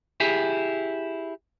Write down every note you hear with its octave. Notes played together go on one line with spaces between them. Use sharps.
E4 G4 G#4